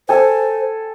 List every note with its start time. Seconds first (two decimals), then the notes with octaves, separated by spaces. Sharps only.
0.09 A4 C5 G#5